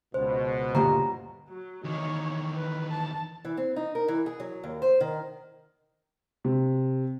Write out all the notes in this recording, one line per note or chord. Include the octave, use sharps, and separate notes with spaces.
C#2 B2 C5
D2 G2 A#2 G4 A#5
F#3
E2 D#3 D#4 C#5
B4
A5
E3
C4
D#4
A#4
E3
G#4
F#3
D#2
C5
D#3
C3